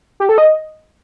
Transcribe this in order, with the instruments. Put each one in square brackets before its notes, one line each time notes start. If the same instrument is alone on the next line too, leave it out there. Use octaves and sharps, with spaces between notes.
[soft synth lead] G4
A4
D#5